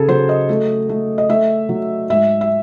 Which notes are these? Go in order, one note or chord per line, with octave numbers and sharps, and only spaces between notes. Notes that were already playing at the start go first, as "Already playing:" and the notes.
Already playing: C#3 G#4 A4
F#3 C5
D#5
A3
A3
D#5
A3 E5
F#3
G#2 E5
E5